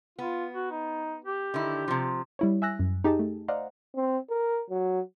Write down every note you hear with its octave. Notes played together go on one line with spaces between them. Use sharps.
B3 F4
F#4
D#4
G4
D3 D#3 E4
C3 F3
G3 E4 C#5
E5 G#5 E6 F#6 A#6
F#2
D#4 G4 G#4 D#5 A5
A3
C5 D5 D#5 F5 F#5 A#5
C4
A#4
F#3